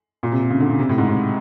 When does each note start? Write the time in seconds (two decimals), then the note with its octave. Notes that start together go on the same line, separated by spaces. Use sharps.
0.23 A#2
0.32 C3
0.42 C3
0.50 C#3
0.60 D3
0.70 C#3
0.79 C3
0.89 A2
0.98 G#2
1.08 G#2